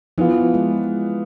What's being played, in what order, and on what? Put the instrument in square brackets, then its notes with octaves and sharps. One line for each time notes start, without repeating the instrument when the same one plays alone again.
[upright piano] E3 B3 F4 [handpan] F3
[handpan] G#3